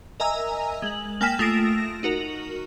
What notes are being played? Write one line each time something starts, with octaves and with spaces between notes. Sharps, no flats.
A#4 D#5 E5 G#5 A#5 E6
G#3 F#7
A#3 G5 G#5 F6 B6 E7
A3 F4 D#6 A#6 D7 E7
D#4 F#4 A#4